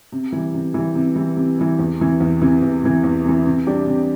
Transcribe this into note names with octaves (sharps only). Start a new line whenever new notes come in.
C3
E3 G3
C3
E3 G3
C3
E3 G3
C3
E3 G3
E2
C3 E3
E2
C3 E3
E2
C3 E3
E2
C3 E3
C3
G3 D4 G4
C3